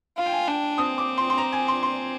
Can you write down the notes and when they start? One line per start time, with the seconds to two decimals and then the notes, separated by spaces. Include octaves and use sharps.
0.18 F4 F5
0.26 G5
0.32 G#5
0.48 D4 G5
0.78 C4 D#6
0.98 D6
1.18 C6
1.30 C6
1.38 A#5
1.53 G#5
1.68 C6
1.83 C6